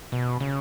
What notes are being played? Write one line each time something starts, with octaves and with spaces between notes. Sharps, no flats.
B2
C#3